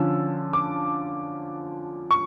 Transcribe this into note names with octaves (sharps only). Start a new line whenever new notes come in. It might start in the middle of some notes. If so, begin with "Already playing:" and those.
Already playing: D3 F3 C#4 F4 E6
D6
C#6